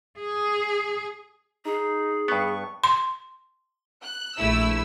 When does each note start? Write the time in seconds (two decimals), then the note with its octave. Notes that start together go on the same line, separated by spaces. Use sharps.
0.20 G#4
1.65 D#4 G#4
2.28 G2 B3 C#6
2.84 C6
4.02 F#6
4.37 A#1 A3 E4 E6